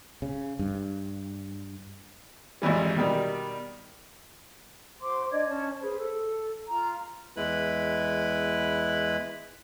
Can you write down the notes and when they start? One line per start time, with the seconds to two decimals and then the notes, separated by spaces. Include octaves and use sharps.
0.22 C#3
0.59 G2
2.62 G#1 F2 E3 G3
2.96 B2 D#3 G3
5.00 F#4 C5 C6 D6
5.30 D4 D5 D#5 G#6
5.47 C#4 C#5 A5
5.80 G#4 B4 C5
5.99 A4
6.67 F4 A#5
7.37 E2 G#3 E4 B4 B5